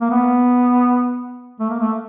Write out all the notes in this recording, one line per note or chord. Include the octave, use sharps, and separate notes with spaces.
A#3
B3
A3
A#3
A3